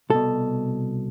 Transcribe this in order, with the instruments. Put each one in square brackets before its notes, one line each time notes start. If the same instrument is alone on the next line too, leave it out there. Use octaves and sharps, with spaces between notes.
[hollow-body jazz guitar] C2 B2 A4